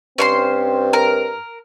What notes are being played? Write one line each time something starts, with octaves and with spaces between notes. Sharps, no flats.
G2 C4 C#4 C5 C6
A#4